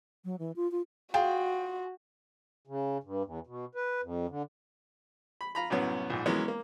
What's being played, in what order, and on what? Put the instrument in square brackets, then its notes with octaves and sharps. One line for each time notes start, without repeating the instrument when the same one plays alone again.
[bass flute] F#3
E3
F4
F4
[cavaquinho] F4 G#4 [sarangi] F#4 [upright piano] G5
[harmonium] C#3
G2
E2
B2
B4
F2
D3
[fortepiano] B5
F4 A#5 B5
C2 F#2 A2 F#3 B3 C#4
A#1 G#2
E3 F#3 G#3 A#3 B3 C#4
A#3